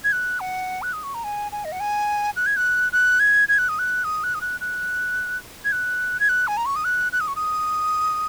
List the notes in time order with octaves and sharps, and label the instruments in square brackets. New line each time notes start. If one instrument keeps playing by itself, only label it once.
[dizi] G#6
F#6
F#5
F#6
D#6
C#6
A#5
G#5
G#5
D#5
F#5
G#5
F#6
G#6
F#6
F#6
G#6
G#6
F#6
D#6
F#6
D#6
F#6
D#6
F#6
F#6
G#6
F#6
G#6
F#6
G#5
A#5
C#6
D#6
F#6
F#6
D#6
C#6
D#6